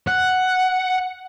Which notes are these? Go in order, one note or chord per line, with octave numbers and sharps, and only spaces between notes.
F#5